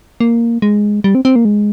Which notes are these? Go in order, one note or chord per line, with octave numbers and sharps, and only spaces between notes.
A#3
G#3
G3
C4
C4
A#3
G#3